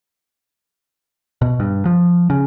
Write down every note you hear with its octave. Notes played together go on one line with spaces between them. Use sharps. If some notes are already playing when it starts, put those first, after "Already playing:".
B2
G2
F3
C#3